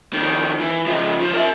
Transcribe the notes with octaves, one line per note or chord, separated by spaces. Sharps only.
F2 D#3
E3
C#3 F3
F3
A#4 E5